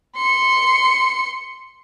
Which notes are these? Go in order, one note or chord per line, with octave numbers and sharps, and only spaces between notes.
C6 C#7